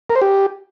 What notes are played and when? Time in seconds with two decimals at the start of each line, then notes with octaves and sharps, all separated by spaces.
0.10 A#4
0.16 C5
0.22 G4